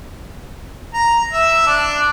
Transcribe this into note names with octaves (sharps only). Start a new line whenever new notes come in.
A#5
E5
D4